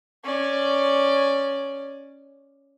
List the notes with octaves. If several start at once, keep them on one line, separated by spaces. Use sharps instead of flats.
C#4 D5